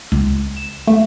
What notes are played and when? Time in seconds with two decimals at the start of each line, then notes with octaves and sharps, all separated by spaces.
0.12 C#2
0.57 E7
0.87 A3